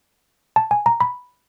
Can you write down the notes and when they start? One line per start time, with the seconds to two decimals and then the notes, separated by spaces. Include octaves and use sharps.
0.56 A5
0.71 G#5
0.86 A#5
1.01 B5